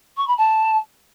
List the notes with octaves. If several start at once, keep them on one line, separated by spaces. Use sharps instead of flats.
C#6
B5
A5